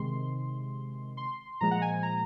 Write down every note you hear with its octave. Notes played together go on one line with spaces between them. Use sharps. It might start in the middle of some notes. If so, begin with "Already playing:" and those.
Already playing: C3 D#3 G#3 C6
C6
A#2 F3 G#3 A#5
F#5
G#5
A#5